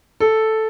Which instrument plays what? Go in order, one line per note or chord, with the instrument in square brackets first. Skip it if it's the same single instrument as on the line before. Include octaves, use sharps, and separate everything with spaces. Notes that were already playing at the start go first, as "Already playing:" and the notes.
[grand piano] A4